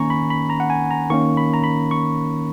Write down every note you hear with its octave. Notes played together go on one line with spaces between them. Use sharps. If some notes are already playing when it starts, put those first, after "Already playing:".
Already playing: D#3 A#3 C#4 G#5 A#5 C#6
B5
B5
A#5
F#5
G#5
A#5
D#3 A#3 C#4 C#6
B5
A#5
B5
C#6